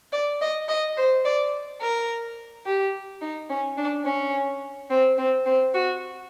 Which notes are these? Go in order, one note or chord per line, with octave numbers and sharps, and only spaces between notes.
D5
D#5
D#5
C5
D5
A#4
G4
D#4
C#4
D4
C#4
C4
C4
C4
F#4